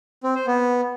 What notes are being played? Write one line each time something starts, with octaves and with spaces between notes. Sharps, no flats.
C4
C5
B3